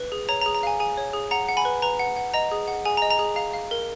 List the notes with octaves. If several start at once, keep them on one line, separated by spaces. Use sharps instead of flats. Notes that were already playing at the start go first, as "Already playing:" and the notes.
Already playing: B4
G#4
C#5 A#5
A#5
G#4
A#5
F5 G#5
G#4 G#5
C#5
G#4
F#5 A#5
F#5
G#5 B5
B4
B4 A#5
F#5
F#5
D#5 A#5
G#4
F#5
G#4 G#5
A#5
D#5
A#5
G#4
F5 A#5
F5
A#4